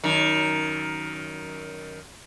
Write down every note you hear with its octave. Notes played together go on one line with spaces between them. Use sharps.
F#2 D#3